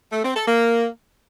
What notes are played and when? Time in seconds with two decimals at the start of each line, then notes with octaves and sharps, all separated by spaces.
0.12 A3
0.24 C4
0.36 A4
0.47 A#3